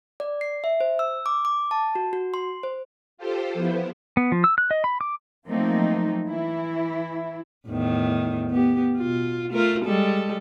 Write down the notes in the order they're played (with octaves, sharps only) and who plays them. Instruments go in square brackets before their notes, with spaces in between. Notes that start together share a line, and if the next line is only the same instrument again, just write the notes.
[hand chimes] D5
C7
E5
C5
E6
D6
D6
A5
F#4
F#4
C6
C5
[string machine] F4 G4 A4 C5
F3 B3 E4
[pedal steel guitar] B3
F3
E6
F#6
D#5
B5
D6
[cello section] F3 F#3 A3 A#3 C4 D#4
E3 E4
[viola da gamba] E2 A2 D#3
B3 G4
B2 F4
A3 F4 A#4
G3 G#3 A4